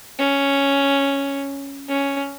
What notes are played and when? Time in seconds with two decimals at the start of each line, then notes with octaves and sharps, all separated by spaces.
0.19 C#4
1.89 C#4